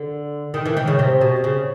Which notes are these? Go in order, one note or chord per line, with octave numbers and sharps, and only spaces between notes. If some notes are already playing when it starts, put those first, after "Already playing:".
Already playing: D3
D#3
E3
D#3
C#3
C3
B2
C#3